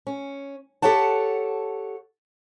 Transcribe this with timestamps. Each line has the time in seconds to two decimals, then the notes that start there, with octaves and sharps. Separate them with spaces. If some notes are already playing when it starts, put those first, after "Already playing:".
0.07 C#4
0.82 G4 A4 C#5 F#5 A5